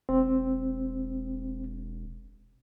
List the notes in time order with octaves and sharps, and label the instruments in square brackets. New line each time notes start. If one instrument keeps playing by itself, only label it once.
[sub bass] E1 [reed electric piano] C4